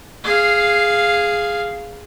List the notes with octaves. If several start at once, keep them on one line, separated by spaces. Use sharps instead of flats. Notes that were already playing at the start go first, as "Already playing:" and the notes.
G#4 F5